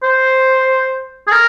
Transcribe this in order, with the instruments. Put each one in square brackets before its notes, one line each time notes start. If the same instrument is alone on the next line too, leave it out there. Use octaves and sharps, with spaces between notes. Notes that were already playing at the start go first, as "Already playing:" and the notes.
[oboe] C5
G#4
A#4